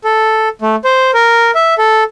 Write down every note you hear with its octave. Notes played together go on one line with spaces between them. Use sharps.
A4
A3
C5
A#4
E5
A4